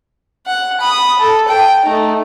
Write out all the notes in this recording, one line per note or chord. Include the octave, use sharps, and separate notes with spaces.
F#5
B5 D#6
A4
G5
A3 D#4